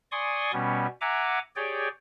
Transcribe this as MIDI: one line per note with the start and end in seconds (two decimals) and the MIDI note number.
0.12 0.51 74
0.12 0.51 80
0.12 0.51 84
0.12 0.51 85
0.12 0.51 87
0.53 0.87 47
0.53 0.87 55
0.53 0.87 59
0.53 0.87 61
1.01 1.39 76
1.01 1.39 78
1.01 1.39 80
1.01 1.39 82
1.01 1.39 86
1.56 1.88 67
1.56 1.88 68
1.56 1.88 73
1.56 1.88 74
1.56 1.88 79